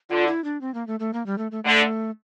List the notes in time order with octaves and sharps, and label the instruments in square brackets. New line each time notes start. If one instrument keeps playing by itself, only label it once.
[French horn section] D3 [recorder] F4
[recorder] E4
D4
C4
A#3
A3
A3
A#3
G3
A3
A3
[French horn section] D3 [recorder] A3